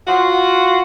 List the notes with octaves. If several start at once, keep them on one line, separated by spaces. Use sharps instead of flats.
F4 F#4